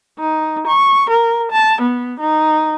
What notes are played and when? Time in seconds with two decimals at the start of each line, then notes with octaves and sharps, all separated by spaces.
0.19 D#4
0.67 C#6
1.10 A#4
1.51 A5
1.81 B3
2.20 D#4